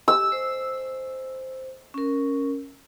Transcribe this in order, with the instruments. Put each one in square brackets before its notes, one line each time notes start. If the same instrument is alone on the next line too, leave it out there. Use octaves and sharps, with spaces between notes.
[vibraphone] G4 [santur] E6
[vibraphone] C5
C#4 A#4